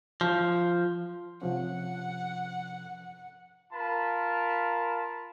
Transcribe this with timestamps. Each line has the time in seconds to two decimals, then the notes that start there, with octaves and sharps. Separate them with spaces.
0.21 F3
1.42 C3 F3 C#4 F#5
3.73 F4 A#4 A5 B5